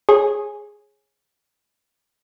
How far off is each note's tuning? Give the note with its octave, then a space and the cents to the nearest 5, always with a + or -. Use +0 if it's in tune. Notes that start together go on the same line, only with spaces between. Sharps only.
G#4 +0 C#5 -35